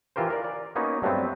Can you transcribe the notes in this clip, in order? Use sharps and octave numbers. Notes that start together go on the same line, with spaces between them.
E3 F4 G4 A#4 C5
A#4 D5
D5
A#3 B3 C#4 D#4 F#4 C#5
G2 F#3 A3 B3 C4